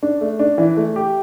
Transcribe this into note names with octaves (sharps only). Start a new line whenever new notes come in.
D4
A3
D4
E3
A3
G4